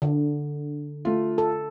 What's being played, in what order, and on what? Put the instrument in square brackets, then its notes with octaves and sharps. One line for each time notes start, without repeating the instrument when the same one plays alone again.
[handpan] D3
[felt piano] A3 F4
[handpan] A4